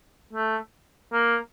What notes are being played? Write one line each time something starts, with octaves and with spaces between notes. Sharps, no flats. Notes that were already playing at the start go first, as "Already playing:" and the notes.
A3
A#3